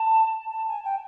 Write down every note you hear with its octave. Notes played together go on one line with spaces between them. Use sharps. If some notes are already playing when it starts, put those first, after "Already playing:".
Already playing: A5
A5
G#5
G5